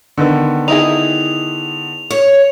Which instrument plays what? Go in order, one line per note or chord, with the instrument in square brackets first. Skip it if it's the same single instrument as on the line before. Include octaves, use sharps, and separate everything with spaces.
[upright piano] D3 D#3 B3
[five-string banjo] D#4 E4 G#4 [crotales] F7
[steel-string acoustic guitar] C#5